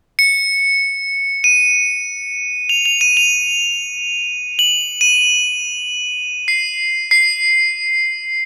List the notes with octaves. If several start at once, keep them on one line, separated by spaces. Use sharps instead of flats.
C#7
D#7
F7
F7
D#7
F7
F#7
D#7
C7
C7